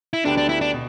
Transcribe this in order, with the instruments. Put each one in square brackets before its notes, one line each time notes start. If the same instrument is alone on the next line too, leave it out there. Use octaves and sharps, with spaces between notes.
[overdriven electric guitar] E4
[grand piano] D2 D3 B3 G4 [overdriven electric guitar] D4
[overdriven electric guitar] D4
E4
D4
[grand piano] B2